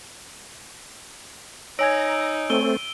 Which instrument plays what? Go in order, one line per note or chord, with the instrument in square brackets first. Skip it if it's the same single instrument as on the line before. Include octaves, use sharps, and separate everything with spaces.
[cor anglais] D#4 [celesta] C#5 G#5 G#6 [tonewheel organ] A#5 [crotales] E6 D7
[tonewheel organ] A3 C4 [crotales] D#7 G7